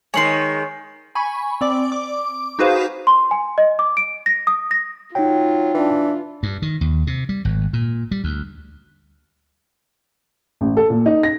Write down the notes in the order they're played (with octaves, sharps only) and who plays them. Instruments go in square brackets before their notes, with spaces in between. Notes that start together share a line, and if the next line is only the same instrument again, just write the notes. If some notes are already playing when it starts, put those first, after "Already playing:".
[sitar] D#3 G#3 [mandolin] C#5 B5 C6 [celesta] G#5 C7
[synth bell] G#5 B5 C#6
C4 D5 D6
D6
D#4 F#4 G#4 B4 C5 F5
[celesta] C6
G#5
D#5
D6
D7
A#6
D#6
A#6
[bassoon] F#3 [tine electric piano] D#4 G5 [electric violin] F4
[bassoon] E3 [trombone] D4
[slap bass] G2
D#3
D#2
C3
G3
G#1
A#2
G3
D2
[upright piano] A1
A4
A#2
D#4
A#6